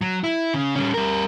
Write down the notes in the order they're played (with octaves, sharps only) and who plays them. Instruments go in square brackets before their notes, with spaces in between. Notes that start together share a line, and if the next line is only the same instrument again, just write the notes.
[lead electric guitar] F#3
E4
C#3
G3 C#4
G3 A#4